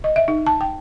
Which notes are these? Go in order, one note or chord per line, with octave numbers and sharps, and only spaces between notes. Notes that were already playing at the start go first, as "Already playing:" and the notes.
D#5
E5
D#4
A5
G5